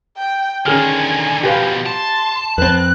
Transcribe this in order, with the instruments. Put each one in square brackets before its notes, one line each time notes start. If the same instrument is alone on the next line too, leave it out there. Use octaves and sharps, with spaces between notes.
[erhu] G5
[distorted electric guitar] D3 D#3 [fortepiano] C#4 G#4 F6 [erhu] G#5
[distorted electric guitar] B2 F3 [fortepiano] G4 B4 F5
[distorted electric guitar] A5 [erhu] C6
[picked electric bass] F2 C4 [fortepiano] B4 [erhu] F#6